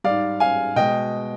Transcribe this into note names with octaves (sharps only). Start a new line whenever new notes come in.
G#2 G3 D5 F5
F5 G#5
B2 G#3 D#5 G5